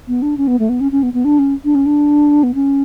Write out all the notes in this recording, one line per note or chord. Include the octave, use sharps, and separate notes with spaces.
B3
D4
C#4
B3
A3
B3
C#4
C#4
B3
B3
D4
C#4
D4
C#4
D4
B3
C#4